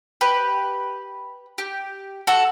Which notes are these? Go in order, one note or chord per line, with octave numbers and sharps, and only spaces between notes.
G4 B4
G4
F#4 A4